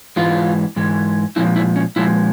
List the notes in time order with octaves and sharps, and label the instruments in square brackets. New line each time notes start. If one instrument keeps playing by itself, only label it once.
[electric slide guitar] G#2 E3 G#3 F4
G#2 E3 G#3
A#2 F3 G#3 E4
E4
C#4
A#2 F3 G#3 E4